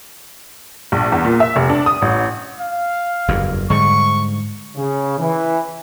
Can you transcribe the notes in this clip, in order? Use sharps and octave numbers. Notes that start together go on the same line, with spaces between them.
A#1
E2
A#2
E5
F1
D4
D#6
A1
F5
F#1 E2 G2
G#2 D3 G3 C#6
C#3
E3